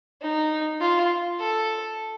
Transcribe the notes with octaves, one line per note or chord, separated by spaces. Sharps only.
D#4
F4
A4